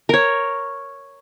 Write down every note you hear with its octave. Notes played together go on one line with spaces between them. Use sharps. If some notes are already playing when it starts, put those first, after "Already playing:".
A#4 C#5